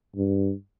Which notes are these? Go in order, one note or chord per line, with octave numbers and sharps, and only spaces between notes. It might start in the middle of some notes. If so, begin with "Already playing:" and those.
G2